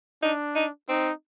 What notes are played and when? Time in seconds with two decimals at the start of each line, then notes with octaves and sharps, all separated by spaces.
0.23 D4 D#4
0.56 D#4
0.89 C4 D#4